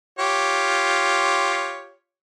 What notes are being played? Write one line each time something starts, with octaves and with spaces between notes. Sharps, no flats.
F4 G4 C#5